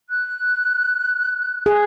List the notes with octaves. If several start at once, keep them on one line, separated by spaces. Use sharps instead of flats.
F#6
G#4